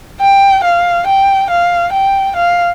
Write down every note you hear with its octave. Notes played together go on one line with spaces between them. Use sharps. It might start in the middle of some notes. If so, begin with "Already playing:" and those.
G5
F5
G5
F5
G5
F5